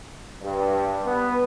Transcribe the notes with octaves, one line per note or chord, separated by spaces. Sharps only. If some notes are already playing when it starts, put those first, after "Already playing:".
G2
B3